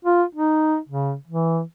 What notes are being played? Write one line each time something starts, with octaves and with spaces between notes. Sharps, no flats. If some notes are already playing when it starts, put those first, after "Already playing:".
F4
D#4
C#3
E3